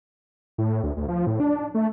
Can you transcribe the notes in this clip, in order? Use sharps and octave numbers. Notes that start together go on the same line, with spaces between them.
A2
D2
D2
F3
A2
D4
A3